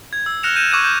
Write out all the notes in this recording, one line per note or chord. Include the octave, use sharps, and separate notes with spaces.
G#6
E6
F6 F#6 A#6 C#7 E7 F7
F6 G6 D#7 E7
C#6 D6 E6 F#6 G#6 D#7
G6